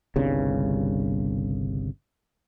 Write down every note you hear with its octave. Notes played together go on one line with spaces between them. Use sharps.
G1 C2 G2 C#3